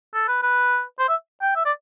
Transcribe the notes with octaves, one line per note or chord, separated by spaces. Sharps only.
A4
B4
B4
C5
E5
G5
E5
D5